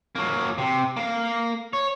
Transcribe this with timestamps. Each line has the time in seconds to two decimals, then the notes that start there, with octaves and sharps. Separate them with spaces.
0.15 F#3 A#3
0.58 C3
0.97 A#3 F5
1.73 C#5